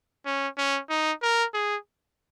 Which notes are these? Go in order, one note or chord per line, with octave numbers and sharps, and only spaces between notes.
C#4
C#4
D#4
A#4
G#4